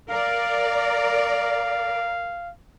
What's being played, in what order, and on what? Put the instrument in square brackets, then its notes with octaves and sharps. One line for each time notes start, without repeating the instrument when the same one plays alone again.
[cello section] A#4 D5 [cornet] F5